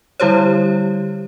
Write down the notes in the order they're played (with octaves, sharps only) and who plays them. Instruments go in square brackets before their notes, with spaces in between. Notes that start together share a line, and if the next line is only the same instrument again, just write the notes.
[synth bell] D3 G3 E4 G4 C5 C#5